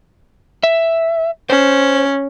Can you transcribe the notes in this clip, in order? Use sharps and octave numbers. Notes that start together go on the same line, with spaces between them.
E5
C#4 C5